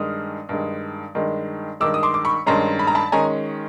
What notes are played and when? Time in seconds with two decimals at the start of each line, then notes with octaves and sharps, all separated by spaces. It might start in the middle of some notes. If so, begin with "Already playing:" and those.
Already playing: G2 D#3 G#3 D#6 F6
0.49 G2 D#3 G#3
1.15 G2 D#3 G#3
1.80 G2 D#3 G#3 D6 E6
1.94 D#6
2.03 C6 D6
2.14 D6
2.25 B5 C#6
2.46 G2 D#3 G#3 C#4 A#5 C6
2.79 B5
2.87 A#5
2.95 A5 B5
3.12 D#3 G#3 C#4 G#5 A#5